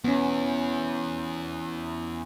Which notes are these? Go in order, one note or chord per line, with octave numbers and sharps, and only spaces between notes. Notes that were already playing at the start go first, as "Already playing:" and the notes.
E2 B3 C#4